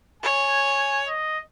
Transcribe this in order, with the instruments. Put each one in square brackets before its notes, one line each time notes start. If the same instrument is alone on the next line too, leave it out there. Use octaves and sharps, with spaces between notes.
[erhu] C#5 [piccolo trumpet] G#5
[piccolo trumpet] D#5